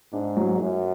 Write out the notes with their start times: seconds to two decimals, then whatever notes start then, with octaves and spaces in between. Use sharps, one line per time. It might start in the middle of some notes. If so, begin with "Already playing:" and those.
0.13 G#2 D4
0.37 F#3
0.60 F#2 F#3